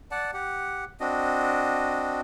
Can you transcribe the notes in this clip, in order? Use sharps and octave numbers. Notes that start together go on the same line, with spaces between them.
D5 F#5 A5
G4 F#5
C4 D4 F#4 D#5